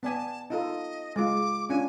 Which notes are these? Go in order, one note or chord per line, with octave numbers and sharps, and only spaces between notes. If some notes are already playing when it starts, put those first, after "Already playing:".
B3 D5 G#5 A5
D#4 F4 A4 D#5
G#3 F4 D6
C#4 D4 F4 G#5